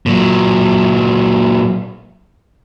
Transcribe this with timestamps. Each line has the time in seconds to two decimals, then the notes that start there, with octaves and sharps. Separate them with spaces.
0.06 A#2 F#3